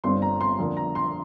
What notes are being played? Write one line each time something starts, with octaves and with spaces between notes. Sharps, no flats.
G1 G2 G3 C4 C6
A#5
C6
F2 D3 A#3
A#5
C6